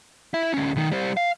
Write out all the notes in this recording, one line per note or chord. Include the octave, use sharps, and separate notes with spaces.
E4 E5
D2 C#4
B1 D#3
G3 C5
F5